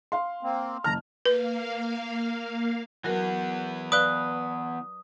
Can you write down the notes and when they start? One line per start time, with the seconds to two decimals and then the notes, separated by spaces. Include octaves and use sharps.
0.12 F5 C6
0.43 A#3 C4
0.84 F#1 A5 A#5 F6
1.26 A#3 B4 F5
3.04 E3 F#3 B3 F#4 A#4
3.92 B4 D5 F5 B5 D#6 F#6 G7